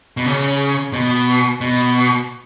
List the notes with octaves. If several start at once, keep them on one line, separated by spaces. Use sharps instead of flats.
B2
C#3
B2
B2